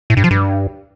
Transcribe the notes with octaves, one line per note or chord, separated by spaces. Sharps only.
A2
G2
F3
G2